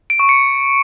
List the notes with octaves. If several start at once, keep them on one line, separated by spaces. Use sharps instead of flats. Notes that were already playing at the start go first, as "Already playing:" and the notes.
D7
C#6
C#7